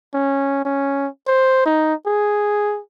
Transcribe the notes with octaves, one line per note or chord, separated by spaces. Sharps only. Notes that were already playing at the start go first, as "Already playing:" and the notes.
C#4
C#4
C5
D#4
G#4